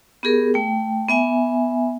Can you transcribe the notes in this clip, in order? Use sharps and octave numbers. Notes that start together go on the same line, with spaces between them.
B3 G4 G#4 A#4
A3 G5
B3 E5 G#5